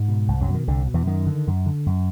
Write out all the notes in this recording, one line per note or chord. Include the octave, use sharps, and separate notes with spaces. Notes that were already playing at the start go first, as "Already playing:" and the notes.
Already playing: G#2 G#3
B2
C2
F#2 F#3
B2
D#3
C2 D3
B2
E2 E3
F#2 D#3
D3
F#2
D3
F#2